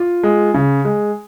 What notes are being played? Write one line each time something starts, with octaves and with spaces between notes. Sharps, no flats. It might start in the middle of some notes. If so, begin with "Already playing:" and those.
Already playing: F4
G#3
C#3
G#3